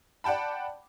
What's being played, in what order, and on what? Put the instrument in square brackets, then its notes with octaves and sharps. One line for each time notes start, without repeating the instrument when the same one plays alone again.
[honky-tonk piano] D5 F#5 G5 A5 B5